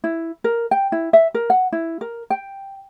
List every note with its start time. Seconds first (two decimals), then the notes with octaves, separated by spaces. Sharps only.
0.04 E4
0.44 A#4
0.71 G5
0.92 E4
1.13 E5
1.34 A#4
1.50 F#5
1.72 E4
2.01 A#4
2.30 G5